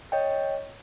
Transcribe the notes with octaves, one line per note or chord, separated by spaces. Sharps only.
C#5 D#5 G5